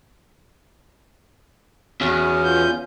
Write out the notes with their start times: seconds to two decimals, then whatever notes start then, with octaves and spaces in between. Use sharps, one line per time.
2.01 E2 C#4 F#4
2.43 F4 G6